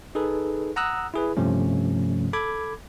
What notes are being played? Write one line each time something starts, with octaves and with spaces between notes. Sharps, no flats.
D#4 G#4 A4 B4
F#5 A#5 D#6 E6 F#6
E4 G#4 B4
G2 C3 F3 A3 C#4
A4 B5 D6 G#6